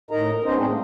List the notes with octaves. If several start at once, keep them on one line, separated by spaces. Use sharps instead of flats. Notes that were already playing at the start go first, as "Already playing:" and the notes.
A2 D#4 A#4 D#5 A#5
A#4
B3 C#4 D#4 C5 D#5
A2 G#3 C4 D4 D#4 G#4
A3 A#3